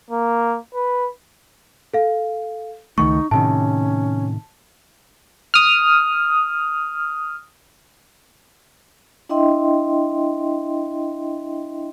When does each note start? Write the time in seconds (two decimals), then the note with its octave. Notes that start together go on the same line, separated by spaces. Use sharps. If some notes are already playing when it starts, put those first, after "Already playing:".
0.11 A#3
0.74 B4
1.94 A4 F5
2.98 C#2 D#3 A3 D#4 C#6
3.31 A2 C3 D#3 C#4 A5
5.54 D#6 F6
9.29 D4 E4 D#5 E5 G5 C6